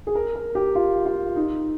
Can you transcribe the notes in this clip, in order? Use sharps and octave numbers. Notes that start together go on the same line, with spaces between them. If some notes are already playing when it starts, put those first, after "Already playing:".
G#4
A#4
A#4
G4
F4
F4
D#4